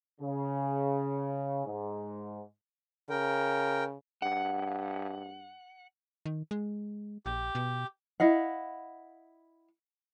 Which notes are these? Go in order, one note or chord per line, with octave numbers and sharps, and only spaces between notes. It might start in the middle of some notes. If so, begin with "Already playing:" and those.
C#3
G#2
C#3 A#4 G5
G2 F#5
D#3
G#3
A#1 G4
B2
E4 D#5 F5 F#5